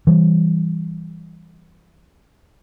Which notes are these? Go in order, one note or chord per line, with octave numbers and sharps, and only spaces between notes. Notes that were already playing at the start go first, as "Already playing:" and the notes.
E3 G3